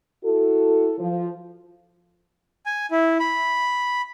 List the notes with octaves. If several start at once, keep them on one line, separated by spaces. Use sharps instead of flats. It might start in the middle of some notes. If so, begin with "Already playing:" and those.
E4 F#4 A4
F3
G#5
E4
B5